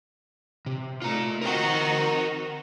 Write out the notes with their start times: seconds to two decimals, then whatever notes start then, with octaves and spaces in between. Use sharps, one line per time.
0.66 C3
1.02 A3 D#4 F4 A#5
1.41 C4 D#4 F#4 A#4 G5